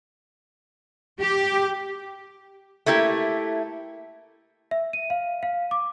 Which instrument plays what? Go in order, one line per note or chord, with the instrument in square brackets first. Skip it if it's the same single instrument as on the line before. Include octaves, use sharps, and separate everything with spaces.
[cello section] G4
[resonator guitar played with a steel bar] A3 A#3 E4 G4
[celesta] E5
D#7
F5
F5
D6